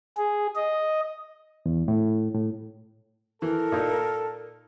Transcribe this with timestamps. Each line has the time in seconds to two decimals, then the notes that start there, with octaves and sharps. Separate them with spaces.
0.17 G#4
0.56 D#5
1.66 E2
1.88 A2
2.35 A2
3.42 E3 A4 A#4
3.72 A#2 D#4